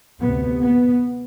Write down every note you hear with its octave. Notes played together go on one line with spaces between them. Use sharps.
D2 C3 B3
B3